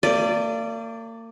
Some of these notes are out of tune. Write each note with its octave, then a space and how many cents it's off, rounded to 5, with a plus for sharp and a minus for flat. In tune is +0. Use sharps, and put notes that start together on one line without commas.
A#3 -40 D5 +0